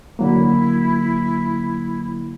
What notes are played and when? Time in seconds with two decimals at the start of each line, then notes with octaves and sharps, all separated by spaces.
0.19 D3 F#3 A#3 E4